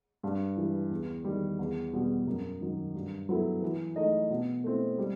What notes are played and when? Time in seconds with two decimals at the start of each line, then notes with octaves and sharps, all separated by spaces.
0.23 G2
0.57 E3 G3
0.91 E2
1.24 D#3 G3
1.59 E2
1.93 B2 G3
2.27 F#2
2.61 D#3 F#3
2.95 G2
3.29 F#3 B3 E4 A4
3.62 E3
3.96 A3 D#4 A4 D#5
4.30 B2
4.64 A3 C4 E4
4.98 G3